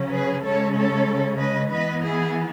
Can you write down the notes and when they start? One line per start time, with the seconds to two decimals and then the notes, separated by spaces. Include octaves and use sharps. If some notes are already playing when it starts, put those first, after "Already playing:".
Already playing: C#3 F#3 C#4
0.12 G#4 B4
0.44 C#3 G#3 C#4 A4 C#5
0.75 A4 C#5
1.39 B4 D#5
1.70 E3 B3 B4 D#5
2.02 E4 G#4